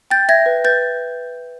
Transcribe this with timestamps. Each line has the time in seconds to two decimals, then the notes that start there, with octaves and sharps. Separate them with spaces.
0.11 G5 G6 A6
0.29 E5 G#6 A#6
0.46 B4
0.65 B4 G6 A6